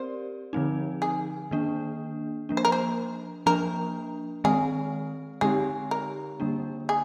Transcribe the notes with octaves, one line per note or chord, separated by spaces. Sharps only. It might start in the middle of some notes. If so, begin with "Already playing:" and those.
Already playing: C4 G4 A#4 C5 D5
D3 F3 C4 D#4
G#4
D#3 A#3 D4
F3 A#3 D4
C5
A#4
C5
F3 A#3 D4 A#4
D#3 G#3 C4 G#4
D3 G#3 C4 D#4 G4 G#4
A#4
D3 G3 A#3 D4
G#4